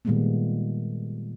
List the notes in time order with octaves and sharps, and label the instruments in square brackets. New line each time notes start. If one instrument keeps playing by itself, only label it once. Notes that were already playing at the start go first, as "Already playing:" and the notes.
[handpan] A#2 D#3 G3 G#3 A#3 B3